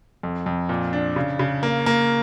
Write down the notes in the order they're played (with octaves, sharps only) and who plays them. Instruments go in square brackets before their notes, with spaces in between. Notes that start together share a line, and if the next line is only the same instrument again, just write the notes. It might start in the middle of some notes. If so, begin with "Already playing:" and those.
[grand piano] F2
F2
A#2
D4
C#3
C#3
A#3
A#3